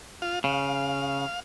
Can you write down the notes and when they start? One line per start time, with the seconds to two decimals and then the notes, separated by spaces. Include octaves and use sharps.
0.22 F4 F5
0.44 C#3 F5